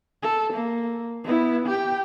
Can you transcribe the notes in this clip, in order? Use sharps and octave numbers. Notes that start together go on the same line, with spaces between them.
A4
A#3
B3 E4
G4 G5